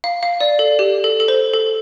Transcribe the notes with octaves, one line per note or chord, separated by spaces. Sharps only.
F5
F5
D5
A4
G4
A4
A4
C5
A4